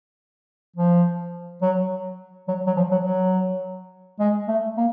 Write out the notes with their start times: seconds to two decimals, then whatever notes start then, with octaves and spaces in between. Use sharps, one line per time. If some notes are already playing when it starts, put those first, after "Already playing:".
0.76 F3
1.62 F#3
2.48 F#3
2.67 F#3
2.76 F3
2.91 F#3
3.05 F#3
4.19 G#3
4.48 A3
4.77 A#3